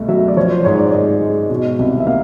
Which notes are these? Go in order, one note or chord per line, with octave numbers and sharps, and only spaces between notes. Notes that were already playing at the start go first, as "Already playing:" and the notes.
Already playing: C2 B2 A3
F#3 E5
D5
F3 C#5
C5
G#2 C#5
D5
G#2 D#5
G#3
B2
C2
E5
A#3 F5